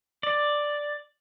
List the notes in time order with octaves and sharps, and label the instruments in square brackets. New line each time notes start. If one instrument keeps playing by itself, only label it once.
[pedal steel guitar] D5